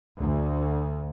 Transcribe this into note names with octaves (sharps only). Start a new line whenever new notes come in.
D2